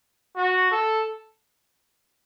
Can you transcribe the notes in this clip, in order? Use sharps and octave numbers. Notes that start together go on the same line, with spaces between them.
F#4
A4